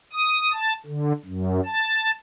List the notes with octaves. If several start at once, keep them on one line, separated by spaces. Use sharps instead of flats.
D#6
A5
D3
F#2
A5